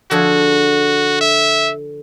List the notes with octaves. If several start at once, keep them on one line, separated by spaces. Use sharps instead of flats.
D3 F3 F#4 G#4
E5